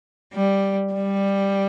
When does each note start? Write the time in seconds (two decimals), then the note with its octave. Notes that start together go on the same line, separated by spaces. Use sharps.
0.34 G3
0.93 G3